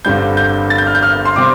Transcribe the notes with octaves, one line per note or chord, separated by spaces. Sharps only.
G1 G2 D3 G3 C4 G6
G6
A6
G6
F6
G6
F6
C6
C3 G3 C4 D6